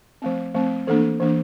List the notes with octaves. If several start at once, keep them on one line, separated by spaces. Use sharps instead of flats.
F3 A3 C4
F3 A3 C4
E3 A#3 D4 A4
E3 A#3 D4